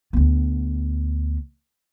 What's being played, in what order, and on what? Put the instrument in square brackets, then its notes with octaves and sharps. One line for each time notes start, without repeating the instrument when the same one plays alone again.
[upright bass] D2 B3